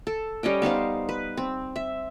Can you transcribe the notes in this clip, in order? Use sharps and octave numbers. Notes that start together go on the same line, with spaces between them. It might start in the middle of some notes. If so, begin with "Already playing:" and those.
A4
G3 C#4 D#5 G5
B3 D#4 C5 F5
B4
C4
E5